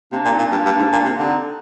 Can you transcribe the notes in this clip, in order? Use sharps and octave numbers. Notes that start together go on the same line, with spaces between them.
C3 A#3 D4
A#2
C4 D#4
A#2
G2 A#3 D4
G2
G#2
A#2
C3
D3 C4 D#4